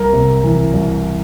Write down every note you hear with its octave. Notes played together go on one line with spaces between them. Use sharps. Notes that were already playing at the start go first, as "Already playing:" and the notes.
Already playing: C2 A#4
C3
E3
C2